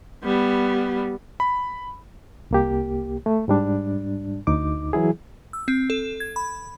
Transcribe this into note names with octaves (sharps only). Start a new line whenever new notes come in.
G3 B3
B5
C2 A#3 G4
A3
G#2 G3 D4
D2 D#4 D6
E3 F#3 E4 G#4
E6
C4
A4
G#6
B5